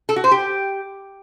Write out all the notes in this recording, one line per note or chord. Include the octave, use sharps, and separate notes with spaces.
A4
F#4
C5
G4